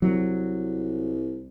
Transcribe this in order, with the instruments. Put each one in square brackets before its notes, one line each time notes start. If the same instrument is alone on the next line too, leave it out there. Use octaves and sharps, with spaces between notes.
[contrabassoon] C2 [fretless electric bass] F#3